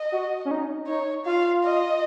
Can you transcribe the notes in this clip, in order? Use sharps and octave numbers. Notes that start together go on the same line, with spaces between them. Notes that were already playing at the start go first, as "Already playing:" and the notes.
Already playing: D#5
F#4
C#4
D#4
D#4 C#5
F4 F5
D#5